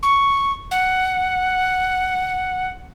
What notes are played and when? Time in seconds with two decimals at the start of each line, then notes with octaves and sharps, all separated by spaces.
0.03 C#6
0.71 F#5